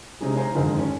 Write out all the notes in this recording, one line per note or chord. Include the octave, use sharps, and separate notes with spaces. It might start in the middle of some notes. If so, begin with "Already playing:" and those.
C3 G#3 C#4 D#4 G#4
C5 G#5 A#5
F2 G#2 D3 D#3 F3
C#4